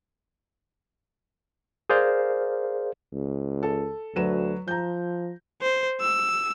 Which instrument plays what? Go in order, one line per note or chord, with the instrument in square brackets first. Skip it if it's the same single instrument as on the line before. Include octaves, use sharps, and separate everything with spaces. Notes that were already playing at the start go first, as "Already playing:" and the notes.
[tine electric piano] G#4 A#4 C5 D5 F5
[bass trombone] C#2
[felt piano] A4
[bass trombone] D2 [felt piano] F#3 B4 E7
[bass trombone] F3 [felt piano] A#5 G6
[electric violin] C5
E6